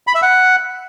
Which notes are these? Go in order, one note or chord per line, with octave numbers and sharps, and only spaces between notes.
B5
E5
F#5